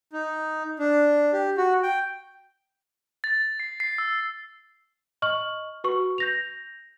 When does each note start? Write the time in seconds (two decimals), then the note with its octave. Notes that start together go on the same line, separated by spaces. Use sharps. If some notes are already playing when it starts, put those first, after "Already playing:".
0.13 D#4
0.79 D4
1.33 G4
1.57 F#4
1.83 G5
3.24 A6
3.60 C7
3.80 C7
3.98 E6
5.22 D#5 C#6 F6 F#7
5.84 F#4 B4 C#6
6.18 G6 A#6 F7